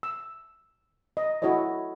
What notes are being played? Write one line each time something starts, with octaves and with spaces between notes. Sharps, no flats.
E6
D#5
E4 F#4 A4 C#5 D#5